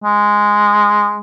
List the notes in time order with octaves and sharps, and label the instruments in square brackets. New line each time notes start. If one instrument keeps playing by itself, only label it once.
[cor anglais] G#3